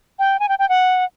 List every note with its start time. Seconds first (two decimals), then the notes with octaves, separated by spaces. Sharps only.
0.19 G5
0.40 G#5
0.49 G5
0.59 G5
0.69 F#5